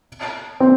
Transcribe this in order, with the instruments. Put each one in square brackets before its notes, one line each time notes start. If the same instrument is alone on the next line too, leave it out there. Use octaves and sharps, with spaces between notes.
[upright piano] C4